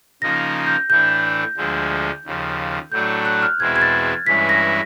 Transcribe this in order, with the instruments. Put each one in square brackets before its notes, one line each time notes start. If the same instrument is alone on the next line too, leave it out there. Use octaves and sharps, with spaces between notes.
[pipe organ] C#3 F3 A#3 D#4 [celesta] A#6
[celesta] G6
[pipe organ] A2 E3 A3 D4 [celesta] G6
[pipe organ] D2 D3 F3 G#3
D#2 C#3 F3
[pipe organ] A2 F#3 A3 D4 [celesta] G6
[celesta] F#6
F6
[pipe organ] E2 B2 G#3 C4 E4 [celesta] G#6
[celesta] G#6
A6
[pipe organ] G2 E3 G#3 C#4 E4 [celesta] B6
[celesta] A#6